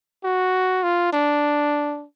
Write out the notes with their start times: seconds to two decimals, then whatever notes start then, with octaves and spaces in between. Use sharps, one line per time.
0.24 F#4
0.83 F4
1.13 D4